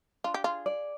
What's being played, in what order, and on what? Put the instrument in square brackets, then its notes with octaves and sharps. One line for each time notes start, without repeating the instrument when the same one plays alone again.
[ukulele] D4 [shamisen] F4
[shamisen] G4
[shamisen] F4 [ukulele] G#4
[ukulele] D5